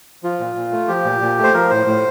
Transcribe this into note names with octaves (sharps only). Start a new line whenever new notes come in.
F3 F4
A#2
A#2
A3
F3 G4
A#2
A#2
A3
C5
F3 A#4
A2 C5
A2